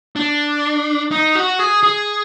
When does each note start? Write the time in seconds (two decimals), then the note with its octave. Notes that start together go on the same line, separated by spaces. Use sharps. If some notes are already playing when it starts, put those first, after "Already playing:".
0.16 D4
1.12 D#4
1.35 F#4
1.59 G#4
1.83 G#4